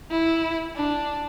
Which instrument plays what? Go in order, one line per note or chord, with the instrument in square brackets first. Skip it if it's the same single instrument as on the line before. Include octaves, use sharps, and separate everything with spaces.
[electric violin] E4
D4